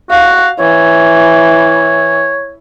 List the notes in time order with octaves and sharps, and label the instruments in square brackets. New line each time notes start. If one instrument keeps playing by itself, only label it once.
[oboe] F#4 [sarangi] F5
[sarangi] E3 [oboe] C#5